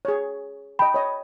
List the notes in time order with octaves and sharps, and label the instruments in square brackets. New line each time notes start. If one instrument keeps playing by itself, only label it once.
[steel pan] G#4 C#5
[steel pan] D#5 G5 [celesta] B5
[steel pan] C#5 D#5